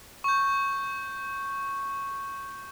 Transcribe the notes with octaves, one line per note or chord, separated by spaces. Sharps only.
C#6 G6